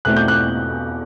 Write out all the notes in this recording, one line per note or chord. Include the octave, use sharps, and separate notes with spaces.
E2 B2 A3 C4 F#6
G6
F#6